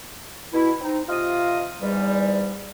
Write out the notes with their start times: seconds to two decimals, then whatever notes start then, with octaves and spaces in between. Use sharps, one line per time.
0.53 B2 E4
0.81 C4 D#4
1.09 C3 F4 D#5 D#6
1.82 E2 G#2 G3